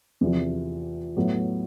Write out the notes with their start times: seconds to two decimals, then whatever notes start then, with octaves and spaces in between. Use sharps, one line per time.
0.21 E2 C3 F3
1.17 A2 F#3 B3